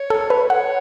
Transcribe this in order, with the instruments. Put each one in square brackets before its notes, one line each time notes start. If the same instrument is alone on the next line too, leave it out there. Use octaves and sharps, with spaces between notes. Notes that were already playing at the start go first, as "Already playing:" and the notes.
Already playing: [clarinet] C#5
[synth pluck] A4
[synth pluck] B4 [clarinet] C#5
[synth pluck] F#5